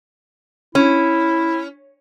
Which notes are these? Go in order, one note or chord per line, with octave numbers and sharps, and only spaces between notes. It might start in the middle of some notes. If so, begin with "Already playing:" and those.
C#4 E4